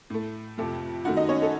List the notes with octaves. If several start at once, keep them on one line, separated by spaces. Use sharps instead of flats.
A2 A3
F2 C3 F3 A3
F#2 D#3 A3 F#4 F#5
D#4 D#5
C#4 C#5
A4